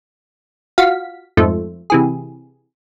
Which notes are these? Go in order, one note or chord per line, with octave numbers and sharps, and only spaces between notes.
F4 F#4 F5 B6
F2 G#2 F3 A3
C3 E3 G#4